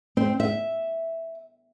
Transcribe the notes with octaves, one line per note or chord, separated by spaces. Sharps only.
C4
E5